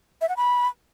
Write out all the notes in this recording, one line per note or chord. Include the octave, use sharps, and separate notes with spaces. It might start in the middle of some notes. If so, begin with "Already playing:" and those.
E5
F#5
B5